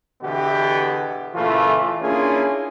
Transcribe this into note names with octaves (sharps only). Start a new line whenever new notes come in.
E2 B2 D3 E3 B3 G4
A#2 C#3 E3 A3 F4 A4
A#3 C#4 D4 E4 F4 G#4